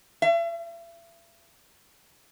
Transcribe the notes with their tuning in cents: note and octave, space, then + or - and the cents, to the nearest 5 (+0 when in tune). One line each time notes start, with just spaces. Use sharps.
E5 +40